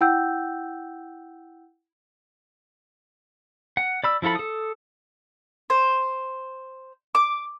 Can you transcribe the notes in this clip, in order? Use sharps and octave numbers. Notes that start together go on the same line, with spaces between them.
E4 F#5 G5 E6 G6
F#5
D5 B5 E6
F3 E4 F4 A4 B5
A4 D#6
C5
D6